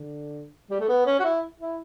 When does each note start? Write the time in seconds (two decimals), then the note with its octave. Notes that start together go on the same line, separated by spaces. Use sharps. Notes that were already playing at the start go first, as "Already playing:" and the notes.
Already playing: D3
0.71 G3
0.80 A3
0.89 B3
1.06 C#4
1.20 F#4
1.24 E4
1.60 E4